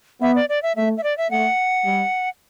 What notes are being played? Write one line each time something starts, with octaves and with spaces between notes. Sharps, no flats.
B3 E5
D5
D5
E5
A3 E5
E5
D5
E5
A3 F#5
G3